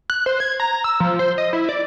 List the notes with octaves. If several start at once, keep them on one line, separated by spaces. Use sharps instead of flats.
F#6
C5
G#6
A#5
E6
F3
C5
D#5
E4
D5